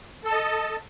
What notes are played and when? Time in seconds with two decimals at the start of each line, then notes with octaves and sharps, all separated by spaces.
0.24 A4
0.28 A5
0.32 D#5